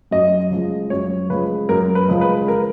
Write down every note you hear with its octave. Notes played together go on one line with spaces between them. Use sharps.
F#2 D#5
C#3 F3 G#3
F#2 C#5
C#3 F3 G#3 B4
F#2 A#4
B4
C#3 F3 G#3
B4
A#4